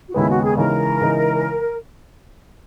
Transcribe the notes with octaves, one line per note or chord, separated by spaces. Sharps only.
F#4
D#2 C#3 G#3 B3 E4
F#4
G#4
C#3 E3 G#3 D#4 A#4
C#3 E3 G#3 D#4